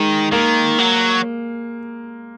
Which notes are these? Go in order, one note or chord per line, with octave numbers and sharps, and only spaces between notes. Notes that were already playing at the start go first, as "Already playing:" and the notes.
Already playing: D#3 G#3
D#3 A#3
F#3